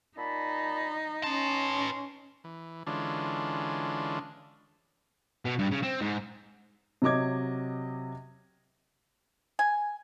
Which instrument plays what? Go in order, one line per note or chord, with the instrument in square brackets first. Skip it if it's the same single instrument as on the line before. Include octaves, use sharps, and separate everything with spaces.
[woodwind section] A#2 A5 B5 [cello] D#4
[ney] C#4 [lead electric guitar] B4 A5 [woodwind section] C6
[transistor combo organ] E3
D3 E3 G#3 C#4 D4 F4
[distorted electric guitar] B2
G2
C#3
C4
G#2
[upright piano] C3 F#3 D#5 D6 G#6
[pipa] G#5